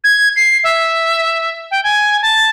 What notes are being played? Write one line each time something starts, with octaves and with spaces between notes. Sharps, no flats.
G#6
C7
E5
G5
G#5
A5